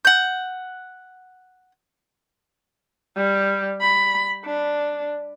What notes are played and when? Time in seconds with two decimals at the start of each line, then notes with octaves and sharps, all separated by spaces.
0.05 F#5 G6
3.17 G3
3.81 B5
4.45 D4